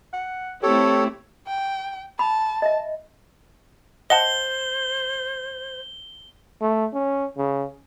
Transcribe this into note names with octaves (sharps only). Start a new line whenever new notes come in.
F#5
A3 C4 E4 G4 A4 C#5
G5
A5 B5
D#5 E5
C5 D#5 F#5 A5 G7
A3
C#4
C#3